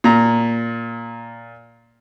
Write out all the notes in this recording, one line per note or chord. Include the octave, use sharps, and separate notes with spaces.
A#2 A#5